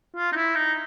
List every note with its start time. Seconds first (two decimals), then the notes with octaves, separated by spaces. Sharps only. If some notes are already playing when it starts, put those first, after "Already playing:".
0.16 F4
0.32 D#4
0.36 E4
0.55 D#4